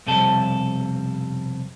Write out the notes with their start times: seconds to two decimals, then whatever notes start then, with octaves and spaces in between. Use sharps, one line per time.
0.06 B1 F2 C3 G3 A4